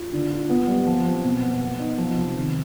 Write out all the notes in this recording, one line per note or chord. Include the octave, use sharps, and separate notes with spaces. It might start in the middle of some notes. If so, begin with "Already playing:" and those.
Already playing: F4
D3
F4
B3
G3
F3
C4
B2
B3
B3
D#4
F3
C3
D#3